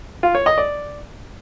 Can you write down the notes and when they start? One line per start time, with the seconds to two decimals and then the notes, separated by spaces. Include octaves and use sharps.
0.23 F4
0.35 C#5
0.46 D#5
0.58 D5